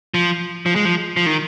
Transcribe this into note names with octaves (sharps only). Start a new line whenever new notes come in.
F3
F3
G#3
F3
F3
D#3